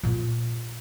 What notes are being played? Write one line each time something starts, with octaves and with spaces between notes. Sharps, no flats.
A#2 F4